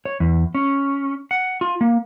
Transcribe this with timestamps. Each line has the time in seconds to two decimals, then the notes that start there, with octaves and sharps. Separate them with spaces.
0.05 C#5
0.20 E2
0.55 C#4
1.31 F#5
1.61 F4
1.81 A#3